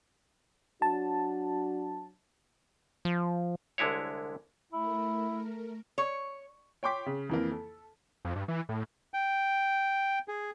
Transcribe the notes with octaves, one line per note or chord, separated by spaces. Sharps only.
F#3 D4 F#4 A5
F3
C2 D3 G#3 E4 C#5
A3 E4 A#4
C#5
C#5 G5 C6 D6 B6
C#3
F2 E3 A#3
A4
F2
G2
E3
A2
G5
G#4